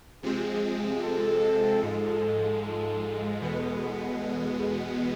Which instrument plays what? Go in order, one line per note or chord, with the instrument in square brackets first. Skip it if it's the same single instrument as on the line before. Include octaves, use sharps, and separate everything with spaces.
[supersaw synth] C3 F3 G#3 C4 [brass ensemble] G#4
[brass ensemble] A4
[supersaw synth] G#2 F3 G#3 [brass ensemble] A4
[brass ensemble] A4
A4
[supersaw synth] E2 B2 G#3 B3 [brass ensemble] A4